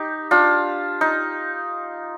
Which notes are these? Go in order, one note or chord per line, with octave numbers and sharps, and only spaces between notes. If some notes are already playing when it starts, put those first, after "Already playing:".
Already playing: D#4 G4
D4 F4
D#4